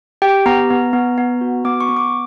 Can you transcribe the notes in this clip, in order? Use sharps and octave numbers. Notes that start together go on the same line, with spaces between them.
G4 G5
B3 A#5
B3
B3
B3
F#4
B3 D6
C#6
B3
D6